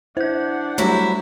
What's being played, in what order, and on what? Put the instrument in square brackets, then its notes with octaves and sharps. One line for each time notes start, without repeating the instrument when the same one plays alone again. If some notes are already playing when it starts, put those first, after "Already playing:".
[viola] D4 F#5 [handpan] E4 [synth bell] C5 G6
[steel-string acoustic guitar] F#3 E4 [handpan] G3 A3